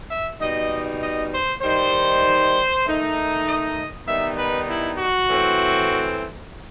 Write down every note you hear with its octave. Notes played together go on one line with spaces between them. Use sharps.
E5
B2 G3 D#4 D#5
D#5
C5
D#3 G3 D#4 C5
D#3 A3 D#4
D#5
D#3 G3 B3 D#4 E5
B4
E4
F#4
A2 E3 A3 C4